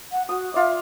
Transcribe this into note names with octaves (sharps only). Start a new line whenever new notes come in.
F#5
F#4 D#6
F4 D5 E5